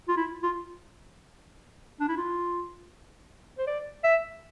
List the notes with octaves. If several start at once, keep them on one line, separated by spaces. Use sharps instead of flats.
F4
E4
F4
D4
E4
F4
C5
D5
E5